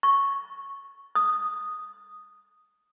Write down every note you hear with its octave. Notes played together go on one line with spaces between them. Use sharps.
C#6
D#6